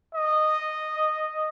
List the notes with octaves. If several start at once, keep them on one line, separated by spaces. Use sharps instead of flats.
D#5